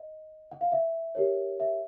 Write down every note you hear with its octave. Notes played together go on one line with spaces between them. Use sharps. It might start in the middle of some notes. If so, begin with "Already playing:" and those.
Already playing: D#5
F#5
F5
E5
G4 A#4 C#5
E5